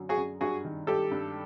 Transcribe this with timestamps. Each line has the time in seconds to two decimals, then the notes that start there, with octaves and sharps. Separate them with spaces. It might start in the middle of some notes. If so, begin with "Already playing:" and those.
Already playing: F#2 D3 F#3
0.09 F#4 G#4
0.17 F#2
0.41 G2 F#4 G#4
0.65 D#3
0.87 G3 G4 A4
1.11 G2